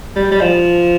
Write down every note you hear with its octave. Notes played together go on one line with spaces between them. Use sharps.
G3
G3
F3